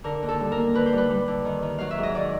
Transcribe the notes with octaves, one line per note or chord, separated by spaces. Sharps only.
D3 A#4
D#2
A4
G3
A#4
A#3
D3 B4
C5
G3 B4
G3
D3
D#3
D#3
F#3 F5
E5
G#2
D#5
D#3 D5